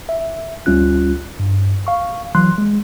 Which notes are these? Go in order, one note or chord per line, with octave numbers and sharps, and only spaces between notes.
E5
D2 G3 C#4 F4 F#6
G2
F5 C#6
E3 F#3 C6 F#6
G#3